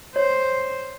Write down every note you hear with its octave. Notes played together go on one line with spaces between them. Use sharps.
C5 C#5